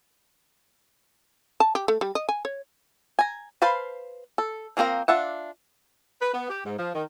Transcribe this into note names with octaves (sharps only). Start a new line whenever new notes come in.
A5
G4
A3
G3
D#5
G#5
C#5
G#5 A#5
B4 C5 F5 A5 B5
A4
F3 A#3 C4 A#4 F5
D4 F4 E5 F#5
B4
B3
G4
G#2
F3
D#3